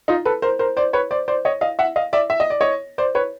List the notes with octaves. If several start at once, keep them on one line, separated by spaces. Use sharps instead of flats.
D#4 F4
A4 B4
A#4 C5
A#4 C5
C5 D5
B4 C#5
C5 D5
C5 D5
C#5 D#5
D#5 F5
E5 F#5
D#5 F5
D5 E5
E5
D#5
D5
C#5 D#5
C5 D5
B4 C#5